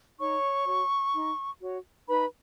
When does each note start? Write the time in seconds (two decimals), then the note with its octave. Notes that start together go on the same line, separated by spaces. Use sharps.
0.19 D#4 C#5 C#6
0.66 F#4 C#5
1.14 D#4
1.61 F#4 C#5
2.08 D#4 B4 B5